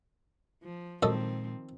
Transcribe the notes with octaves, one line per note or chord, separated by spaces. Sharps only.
F3
F#2 A#2 D#3 F3 G#3 C4 A4 D#5